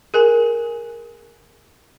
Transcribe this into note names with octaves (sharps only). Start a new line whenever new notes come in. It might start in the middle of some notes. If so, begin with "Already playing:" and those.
G#4 A#4 G#5